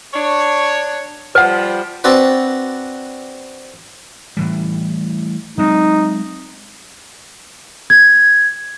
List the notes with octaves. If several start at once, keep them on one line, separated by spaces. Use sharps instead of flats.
D4 C#5
F3 G3 C5 F#5
C4 D4 F#4 B4
A2 E3 G3
F#3 G#3 C4 D#4
G#6